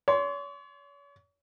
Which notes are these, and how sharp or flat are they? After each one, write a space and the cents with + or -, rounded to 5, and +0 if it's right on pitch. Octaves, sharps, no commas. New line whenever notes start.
C#5 +40 C6 -5